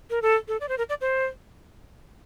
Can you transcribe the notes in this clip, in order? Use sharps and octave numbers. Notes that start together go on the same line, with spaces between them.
A#4
A4
A4
D5
C5
A#4
D5
C5